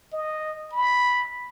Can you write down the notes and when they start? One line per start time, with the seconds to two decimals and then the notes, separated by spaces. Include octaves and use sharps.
0.13 D#5
0.72 B5